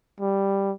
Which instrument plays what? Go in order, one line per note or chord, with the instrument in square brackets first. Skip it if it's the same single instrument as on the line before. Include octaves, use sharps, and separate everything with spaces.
[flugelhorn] G3